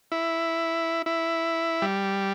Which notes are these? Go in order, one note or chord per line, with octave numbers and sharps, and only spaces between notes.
E4
E4
G3